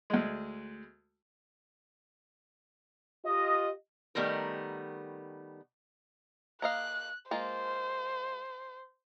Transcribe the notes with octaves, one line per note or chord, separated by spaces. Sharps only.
D2 G#3
F4 G4 D#5
D#3 G3 A3 B3 A#4
A#3 D#5 F5 F#6
G#3 A#3 F4 C5